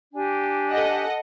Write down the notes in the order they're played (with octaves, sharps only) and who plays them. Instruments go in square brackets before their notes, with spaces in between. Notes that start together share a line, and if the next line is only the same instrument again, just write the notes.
[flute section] D4 G4 G#5
[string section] A4 D#5 F#5